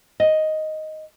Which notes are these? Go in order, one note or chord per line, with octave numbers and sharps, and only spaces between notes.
D#5